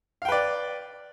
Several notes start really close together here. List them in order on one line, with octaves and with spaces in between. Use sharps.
F5 G5 B4 D5